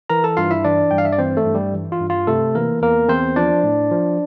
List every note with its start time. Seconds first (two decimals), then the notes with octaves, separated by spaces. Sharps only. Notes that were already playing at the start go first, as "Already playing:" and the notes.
0.10 E3 A#4 A#5
0.24 A4 A5
0.37 G2 F4 F5
0.50 E4 E5
0.65 E3 D4 D5
0.91 G2 G5
0.98 F5
1.05 E5
1.12 D5
1.18 E3 C4 C5
1.37 A3 A4
1.46 G2
1.55 G3 G4
1.74 E3
1.92 F4
2.01 G2
2.10 F4
2.27 C3 A3 A4
2.55 E3 A#3 A#4
2.82 E2 A#3 A#4
3.09 E2 C4 C5
3.36 F3 D4 D5
3.64 A2
3.91 F3